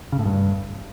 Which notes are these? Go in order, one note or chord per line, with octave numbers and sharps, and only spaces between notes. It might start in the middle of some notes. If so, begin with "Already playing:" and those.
C#3
A2
G2